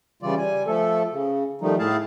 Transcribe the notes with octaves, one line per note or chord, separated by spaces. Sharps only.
C#3 E3 G3 F4 D5
G3 G#5
F3 A3 A4
C#3
D#3 F3 G3 A3 D#4
A2 A3 E4 G#4 F5 A5